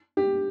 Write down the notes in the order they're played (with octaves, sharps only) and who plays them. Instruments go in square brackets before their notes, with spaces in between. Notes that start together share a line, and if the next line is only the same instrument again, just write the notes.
[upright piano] G4